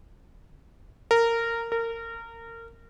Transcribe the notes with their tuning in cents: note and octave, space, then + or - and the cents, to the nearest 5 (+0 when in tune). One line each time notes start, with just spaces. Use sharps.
A#4 -15
A#4 -25